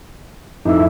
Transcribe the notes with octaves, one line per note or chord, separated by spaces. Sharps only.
F2 A2 F3 D#4 E4 E5